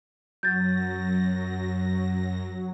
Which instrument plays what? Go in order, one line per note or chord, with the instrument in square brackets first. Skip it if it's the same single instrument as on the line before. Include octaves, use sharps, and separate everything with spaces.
[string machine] F#2 A#6 [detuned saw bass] F#3 [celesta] G6 A6